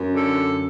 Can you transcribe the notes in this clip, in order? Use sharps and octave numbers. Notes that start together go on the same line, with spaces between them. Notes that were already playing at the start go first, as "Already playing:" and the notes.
Already playing: F#2
D3 A4